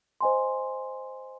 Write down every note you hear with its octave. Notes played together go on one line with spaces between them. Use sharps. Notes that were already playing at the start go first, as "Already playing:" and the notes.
C5 D#5 G#5 C6